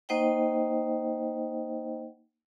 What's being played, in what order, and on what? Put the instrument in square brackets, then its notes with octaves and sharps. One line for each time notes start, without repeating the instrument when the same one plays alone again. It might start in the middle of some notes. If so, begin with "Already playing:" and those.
[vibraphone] A#3 D#4 C5 D#5 F#5 G5